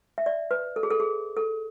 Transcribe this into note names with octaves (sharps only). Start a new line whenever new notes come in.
E5
D5
B4
A4
G#4
A4
G#4
A4